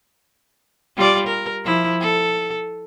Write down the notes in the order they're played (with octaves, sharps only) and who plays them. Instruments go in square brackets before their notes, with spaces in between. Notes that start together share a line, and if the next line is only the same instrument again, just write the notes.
[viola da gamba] G3 F4 D5
A#4
F3 E4
A4